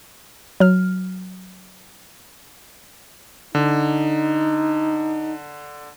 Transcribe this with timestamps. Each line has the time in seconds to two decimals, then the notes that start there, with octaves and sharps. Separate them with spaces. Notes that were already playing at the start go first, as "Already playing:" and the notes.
0.60 F#3 F6
3.55 D3 D#4